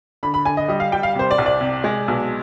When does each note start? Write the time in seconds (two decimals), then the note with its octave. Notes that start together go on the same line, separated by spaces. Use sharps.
0.23 D3 B5
0.34 B5
0.45 D3 G#5
0.57 D#5
0.68 G3 D#5
0.80 F5
0.92 G3 G5
1.03 F5
1.15 C3 C5
1.31 D5
1.38 C2
1.46 D5
1.61 C3
1.84 G#3
2.08 B1